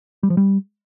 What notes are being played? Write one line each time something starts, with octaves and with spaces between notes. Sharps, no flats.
G3
F3
G3